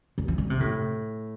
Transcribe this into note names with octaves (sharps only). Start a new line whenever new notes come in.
D3
F3
D3
C3
A2